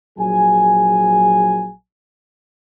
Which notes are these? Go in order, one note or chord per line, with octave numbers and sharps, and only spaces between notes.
A#1 F#3 G#4 G#5